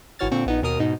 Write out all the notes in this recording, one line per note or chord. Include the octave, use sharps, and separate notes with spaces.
G#1 E3 F#4 C#5 F6 A6
A#2 D3 C4 C#6
A#1 B3 D#4
D#2 B2 A#4 D#6 F6
G#2 B2 D#4